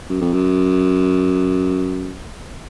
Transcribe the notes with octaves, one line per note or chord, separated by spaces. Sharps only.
F#2
F2
F#2